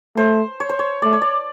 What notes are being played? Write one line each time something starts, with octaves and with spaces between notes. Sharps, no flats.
A3 C5
C#5
C5
C#5
A3 D5
C#5
D5